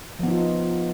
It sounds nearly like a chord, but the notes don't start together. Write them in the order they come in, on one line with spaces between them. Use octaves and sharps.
F3 B3 D#4 F4